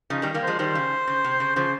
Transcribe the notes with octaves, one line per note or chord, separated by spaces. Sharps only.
C#3 F3 D#4
D#3 G3
G3 A#3
F3 G#3 C5
D#3 G3 C5
C#3
C#3
C3
C#3
C#3 F3 C5